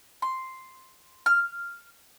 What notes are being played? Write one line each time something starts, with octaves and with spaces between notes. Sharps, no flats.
C6
F6